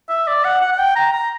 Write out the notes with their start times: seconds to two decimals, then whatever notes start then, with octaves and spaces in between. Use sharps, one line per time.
0.09 E5
0.28 D5
0.45 F#5
0.62 F#5
0.72 F#5
0.79 G5
0.96 A#5
1.13 A#5